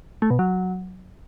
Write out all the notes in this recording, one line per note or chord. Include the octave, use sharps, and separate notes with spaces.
A3
B2
F#3